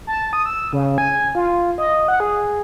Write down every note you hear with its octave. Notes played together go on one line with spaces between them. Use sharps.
A5
D#6
E6
C#3
G#5
F4
D#5
F#5
G#4